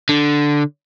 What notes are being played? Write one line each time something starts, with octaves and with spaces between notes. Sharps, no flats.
D3